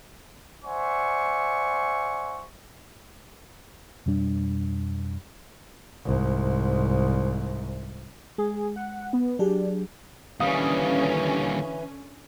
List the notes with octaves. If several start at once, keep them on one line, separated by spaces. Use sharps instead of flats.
C5 D5 E5 F#5 G#5 C#6
F2 B2 G3 D4
C2 G#2
G#3 G#4
F#5
B3
F#3 D4 G4 G#4
D#2 D3 E3 G3 C#4 F5 D#6